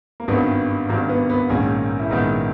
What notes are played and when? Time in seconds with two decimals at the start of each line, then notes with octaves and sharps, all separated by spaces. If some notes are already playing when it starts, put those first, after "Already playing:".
0.20 A#3
0.28 G#1 G2 D#3 B3
0.89 G#1 G2 D#3 A#3
1.09 B3
1.30 B3
1.49 A#1 G#2 D#3 A#3 C#4
1.99 E4
2.10 A#1 G#2 D#3 B3 D#4